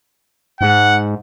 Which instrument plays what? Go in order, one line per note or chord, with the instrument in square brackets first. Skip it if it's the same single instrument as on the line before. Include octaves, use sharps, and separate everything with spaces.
[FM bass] G#2 [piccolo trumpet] F#5